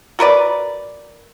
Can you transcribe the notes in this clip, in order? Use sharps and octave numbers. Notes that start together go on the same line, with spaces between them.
F#4 A#4 B4 D5